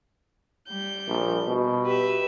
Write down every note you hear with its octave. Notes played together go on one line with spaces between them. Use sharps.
G3 G6
A#1
B2
G4 B4 E5